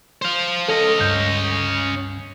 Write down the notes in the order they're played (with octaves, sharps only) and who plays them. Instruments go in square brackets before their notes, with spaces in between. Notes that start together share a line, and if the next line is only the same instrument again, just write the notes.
[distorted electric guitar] C5 F5
[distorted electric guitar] C#4 D#5 [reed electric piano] A4
[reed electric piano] C#2 G2 G6